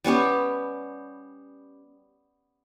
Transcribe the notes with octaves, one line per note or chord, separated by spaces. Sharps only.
G3 B3 C#4 G4